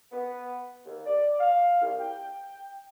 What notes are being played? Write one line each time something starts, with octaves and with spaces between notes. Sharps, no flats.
B3
D#2
D5
F5
C2
G5